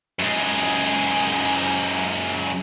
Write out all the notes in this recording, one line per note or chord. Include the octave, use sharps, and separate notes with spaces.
F#2 G#3